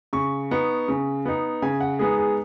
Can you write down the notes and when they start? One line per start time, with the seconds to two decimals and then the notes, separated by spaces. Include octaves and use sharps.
0.13 C#3 C#6
0.51 B3 D#4
0.88 C#3
1.26 B3 D#4
1.62 C#3 G#5
1.80 F#5
1.99 G#3 B3 D#4 G#4
2.18 G#4